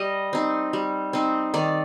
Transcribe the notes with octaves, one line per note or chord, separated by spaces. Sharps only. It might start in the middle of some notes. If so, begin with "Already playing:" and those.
Already playing: G3 D#5
C4 D#4
G3
C4 D#4
D#3 D5